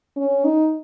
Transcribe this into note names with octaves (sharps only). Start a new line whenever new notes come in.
C#4
D#4